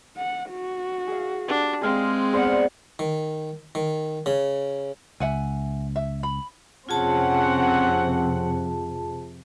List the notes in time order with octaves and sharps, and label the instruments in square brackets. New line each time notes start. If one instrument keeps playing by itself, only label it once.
[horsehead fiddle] F#5
F#4
[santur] G#4 F5
[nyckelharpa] D4 [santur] G4 F#5
[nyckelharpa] G#3 C4 [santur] G#4 F5 G5
[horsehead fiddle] B3 F#5 [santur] G#4 C5 D5
[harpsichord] D#3
D#3
C#3
[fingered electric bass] C#2 [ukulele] E5 F#5 G#5
[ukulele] E5
B5
[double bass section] F2 C3 [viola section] C4 C#4 F#5 [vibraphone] F4 G#4 A5